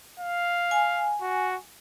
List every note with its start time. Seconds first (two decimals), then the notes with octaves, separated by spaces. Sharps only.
0.20 F5
0.71 G#5
1.21 F#4